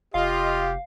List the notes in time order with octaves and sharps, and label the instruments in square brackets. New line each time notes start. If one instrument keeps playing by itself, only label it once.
[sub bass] F1 [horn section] F4 D#5 [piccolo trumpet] G4 [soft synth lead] F5